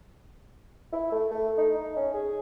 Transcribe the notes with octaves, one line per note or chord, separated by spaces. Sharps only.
E4
A3
A3
D#4
D#4
C#4
G#4